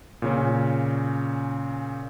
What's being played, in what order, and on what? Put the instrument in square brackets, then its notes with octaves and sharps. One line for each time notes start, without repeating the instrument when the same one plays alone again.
[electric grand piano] A#2 C#3 C#4